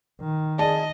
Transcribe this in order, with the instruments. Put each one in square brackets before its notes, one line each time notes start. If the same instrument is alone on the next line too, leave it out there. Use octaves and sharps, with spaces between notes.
[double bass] D#3
[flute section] G#4 D5 [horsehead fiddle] D#5 [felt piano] A5